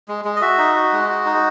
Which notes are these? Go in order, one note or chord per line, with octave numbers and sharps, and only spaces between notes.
G#3
G#3
D#5
F#4 E5
D#4
F#4
G#3
F#4
D#4